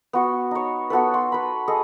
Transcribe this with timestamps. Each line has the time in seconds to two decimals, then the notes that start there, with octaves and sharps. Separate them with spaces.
0.13 B3 F#4 C#6
0.51 D#4 C#5
0.90 B3 F#4 A4 B4
1.14 C6
1.32 B4 B5
1.68 G#4 A4 D#5